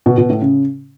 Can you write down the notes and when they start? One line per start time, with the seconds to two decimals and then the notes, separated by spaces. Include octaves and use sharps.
0.06 B2
0.18 B2
0.29 A2
0.41 C#3